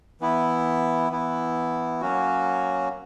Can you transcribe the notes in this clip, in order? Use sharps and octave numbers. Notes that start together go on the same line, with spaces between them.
E3 B3 E4
E3 B3 E4
F#3 A#3 C#4 F#4